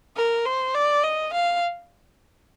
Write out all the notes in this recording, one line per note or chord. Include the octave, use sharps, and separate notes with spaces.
A#4
C5
D5
D#5
F5